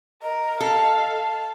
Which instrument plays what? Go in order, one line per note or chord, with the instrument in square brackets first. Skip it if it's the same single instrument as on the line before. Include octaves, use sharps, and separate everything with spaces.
[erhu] A#4 [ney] D#5
[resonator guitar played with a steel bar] A4 [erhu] F5